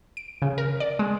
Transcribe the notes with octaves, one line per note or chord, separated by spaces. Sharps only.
D7
C#3
A#4
D5
G#3